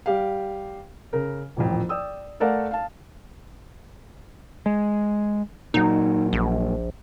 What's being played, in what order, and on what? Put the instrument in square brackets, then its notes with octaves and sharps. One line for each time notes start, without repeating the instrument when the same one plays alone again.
[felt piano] G3 G4 F5
C#3 A#4
D#1 A1 F2
D5 G5 D#6 E6
A3 A4 A#4 D5 F5 F#5
F5 A5
[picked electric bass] G#3
[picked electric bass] A#2 F#3 [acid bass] D#4
[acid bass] A#1